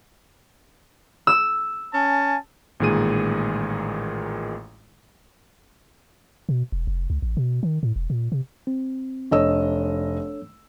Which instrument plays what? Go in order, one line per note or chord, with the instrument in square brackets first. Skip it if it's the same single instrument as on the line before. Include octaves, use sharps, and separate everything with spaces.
[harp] E6
[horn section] C#4 G#5 A5
[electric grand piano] A1 A#2 D#3 G#3 G#4 D#7
[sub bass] B2
E1
F1
C#2
A1
B2
D#3
A2
E1
A#2
C3
[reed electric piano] C4
[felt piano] F1 D#5 E6 [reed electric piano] D4 A4 C#5